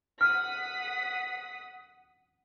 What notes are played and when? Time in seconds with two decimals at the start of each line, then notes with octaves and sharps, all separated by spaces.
0.21 F#5 D#6 F6 B6